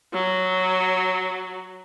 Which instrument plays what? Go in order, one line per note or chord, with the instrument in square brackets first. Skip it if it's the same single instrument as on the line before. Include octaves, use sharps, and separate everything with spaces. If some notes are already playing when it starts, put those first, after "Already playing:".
[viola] F#3